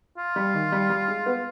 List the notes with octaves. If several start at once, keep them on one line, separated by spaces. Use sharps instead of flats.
F4
G3
D#3
G3
G3
G#3
B3